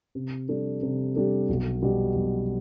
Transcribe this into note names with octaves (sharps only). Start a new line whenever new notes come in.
C3
G3 D4 A4
C3
G3 D4 A4
B1
B2 G3
B1